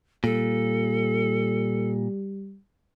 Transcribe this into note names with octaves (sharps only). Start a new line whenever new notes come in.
A#2 G3 A4